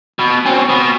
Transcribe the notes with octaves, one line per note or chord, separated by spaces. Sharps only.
B2
C4 C#4
B2